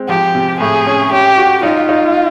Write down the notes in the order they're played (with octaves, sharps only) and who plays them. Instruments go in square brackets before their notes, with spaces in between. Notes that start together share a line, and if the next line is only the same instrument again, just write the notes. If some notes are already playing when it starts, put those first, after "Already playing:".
Already playing: [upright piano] G#3 C4
[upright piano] F3 [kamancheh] G4
[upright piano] C3
[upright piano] A2 [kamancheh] G#4
[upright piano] C#4
[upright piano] C#4 [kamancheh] G4
[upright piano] F#4
[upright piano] D#4 [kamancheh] F4
[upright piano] D#4